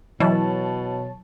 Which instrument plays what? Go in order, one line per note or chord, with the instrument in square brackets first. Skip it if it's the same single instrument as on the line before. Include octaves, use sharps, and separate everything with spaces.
[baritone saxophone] B2 [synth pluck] E3 [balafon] F#3 [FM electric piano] C#5 A5